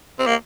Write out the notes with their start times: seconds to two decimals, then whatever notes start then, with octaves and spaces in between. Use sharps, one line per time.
0.19 C4
0.27 A#3